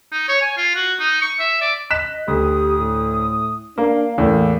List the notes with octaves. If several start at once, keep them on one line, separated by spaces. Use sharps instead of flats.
D#4
C#5
G#5
F4
F#4
D#4
C#6
E5
D5
D#5 F#6 B6 E7
D2 G4 D#6
A2
A#3 D4 F5
E2 A2 A#3